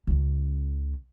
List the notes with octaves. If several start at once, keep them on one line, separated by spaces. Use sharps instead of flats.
C#2 C#3